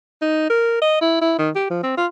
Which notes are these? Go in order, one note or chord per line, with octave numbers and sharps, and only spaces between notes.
D#4
A#4
D#5
E4
E4
D#3
G4
F3
C4
F4